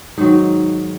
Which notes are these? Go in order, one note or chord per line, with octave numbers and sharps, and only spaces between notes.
G#2 D#3 F#3 D#4